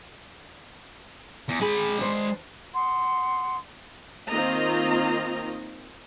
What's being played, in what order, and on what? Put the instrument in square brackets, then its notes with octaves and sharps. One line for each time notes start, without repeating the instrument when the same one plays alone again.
[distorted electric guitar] E2
[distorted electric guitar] G#3 B5 [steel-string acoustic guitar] G#4
[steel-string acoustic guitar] D4 C5
[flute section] F#5 C6 D#6
[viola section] D#3 A#3 C4 F4 D#5 A#5